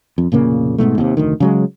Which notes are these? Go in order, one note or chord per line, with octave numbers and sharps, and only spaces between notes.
F2
F1 A#2 C#3 A#3
G#2 B2 D#3 A3
D#2 C3
F1 D2 D#3
C#3 F#3 G#3